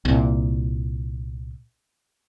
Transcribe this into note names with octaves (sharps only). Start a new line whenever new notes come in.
C2 A#2